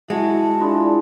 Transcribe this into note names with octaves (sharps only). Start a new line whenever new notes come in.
G#3 E4 F#4 A5
D4 E4 F4 G#4